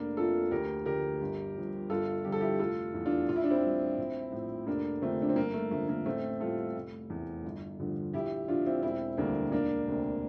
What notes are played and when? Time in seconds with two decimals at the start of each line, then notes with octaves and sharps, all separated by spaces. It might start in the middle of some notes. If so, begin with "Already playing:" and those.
Already playing: F1 A#3 D4
0.17 F2 C3 F3 F4 A4
0.51 D2 G4 A#4
0.86 D3 F3 G4 A#4
1.21 G1
1.55 G2 F3
1.90 G1 F4 A4
2.25 G2 D3 F3 G4
2.32 A4
2.41 E4 G4
2.59 F1 F4 A4
2.94 E2 E3
3.06 D4 F4
3.29 A#1 F4
3.36 E4
3.44 D4
3.50 C4 E4
3.64 A#2 G3
3.98 A#1
4.32 A2 F3
4.67 F1 A#3 D4
5.02 F2 D3 F3 A3 C4
5.22 D4
5.29 C4
5.36 G1 A#3
5.54 A3
5.71 F2 D3 F3 A3
5.89 A#3
6.06 A1 A3 C4
6.40 A2 G3 F4 A4
6.75 F1
7.10 E2 C3 E3
7.44 G1
7.79 G2 D3 F3
8.13 A#1 E4 G4
8.48 A#2 F3 D4 F4
8.66 C4 E4
8.82 E1 C4 E4
9.17 D2 D3 G3 A#3 D4
9.52 E1 A#3 D4
9.87 D2 C3